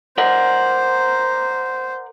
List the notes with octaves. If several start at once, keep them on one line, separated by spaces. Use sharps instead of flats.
A#4 C5 D5 F#5